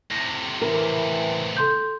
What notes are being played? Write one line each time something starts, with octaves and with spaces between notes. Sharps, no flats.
A2 C3 A#6
E3 A#4
A4 C6 G6